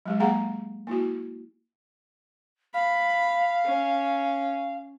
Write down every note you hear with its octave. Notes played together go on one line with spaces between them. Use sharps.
F#3 G#3 G4
A#3 G#4 F5 F#5 A#5
A#3 E4 F#4
F5 B5
C#4